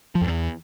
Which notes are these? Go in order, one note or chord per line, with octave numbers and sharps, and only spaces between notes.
F3
F2
E2